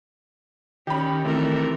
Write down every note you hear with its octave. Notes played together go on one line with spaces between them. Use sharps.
D#3 C#4 G4 B5
C3 D#3 E3 A3 E4 A#4